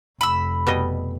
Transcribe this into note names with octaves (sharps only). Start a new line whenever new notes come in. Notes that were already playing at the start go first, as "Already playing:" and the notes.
F1 B5 E6
B2 G3 D#5